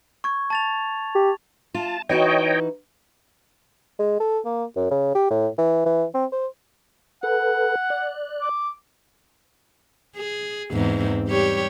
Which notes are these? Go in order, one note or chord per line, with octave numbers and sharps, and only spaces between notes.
C#6 G#6
A5 A6 F7
G4
F4 A5
E3 D#4 F#4 C#5 D#5 G5
G#3
A4
A#3
F#2
C#3
G4
A2
E3
E3
C4
C5
A4 B4 F#5
D5 F#6
D6
G#4
E2 G#2 C4
G3 G4 C#5